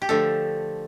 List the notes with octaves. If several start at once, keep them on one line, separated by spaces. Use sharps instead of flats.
G4
D3 F3 A3 A4